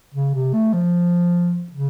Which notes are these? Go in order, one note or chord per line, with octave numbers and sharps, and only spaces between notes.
C#3
C3
A3
F3
C#3